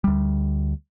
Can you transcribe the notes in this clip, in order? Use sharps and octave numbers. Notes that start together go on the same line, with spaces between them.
D2 G3